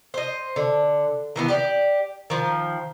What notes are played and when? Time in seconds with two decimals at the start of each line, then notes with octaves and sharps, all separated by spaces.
0.14 C5 D#5
0.56 D3
1.36 D#3 E3 B3
1.48 G4 D5
2.30 D#3 F3